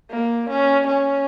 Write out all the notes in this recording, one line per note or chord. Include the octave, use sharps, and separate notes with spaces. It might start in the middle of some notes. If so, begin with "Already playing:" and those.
A#3
C#4
C#4